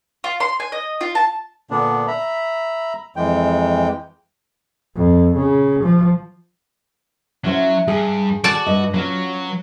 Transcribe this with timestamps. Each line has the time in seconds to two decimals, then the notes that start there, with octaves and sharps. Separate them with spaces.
0.24 F4
0.40 C6
0.60 G#5
0.72 D#5
1.01 F4
1.15 A5
1.71 A#2 D3 B3 D4
2.07 E5 A#5 B5
3.16 F2 E3 G#3 G5
4.96 F2
5.36 C#3
5.84 F3
7.44 F#3 C#4 E4 C5
7.88 G2 G#4
8.44 F#4 D5 A5
8.66 G2 D#5
8.94 F#3 C#4 F4 B4